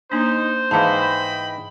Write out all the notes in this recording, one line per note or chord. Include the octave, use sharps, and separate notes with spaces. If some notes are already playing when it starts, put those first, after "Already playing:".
A#3 D4 D#4 C5
G#2 E3 G#3 D#5 F5 G5 A5 B5